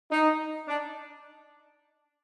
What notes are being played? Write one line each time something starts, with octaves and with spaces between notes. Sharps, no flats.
D#4
D4